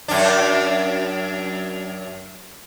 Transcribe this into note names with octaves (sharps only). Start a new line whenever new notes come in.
F#2 D4